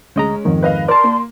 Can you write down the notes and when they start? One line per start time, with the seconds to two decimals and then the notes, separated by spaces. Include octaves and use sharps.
0.16 D2 G#3 C#4 D#5 A#5
0.45 F2 G#2 D#3
0.62 B4 D#5 F5
0.88 A#4 D5 A5 C6
1.04 A#3